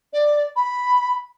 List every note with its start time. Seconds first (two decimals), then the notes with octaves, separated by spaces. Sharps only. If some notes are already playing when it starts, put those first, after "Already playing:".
0.13 D5
0.56 B5